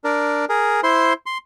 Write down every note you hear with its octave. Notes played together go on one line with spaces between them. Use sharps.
D4 A#4
G#4 A#4
E4 C5 C6
C6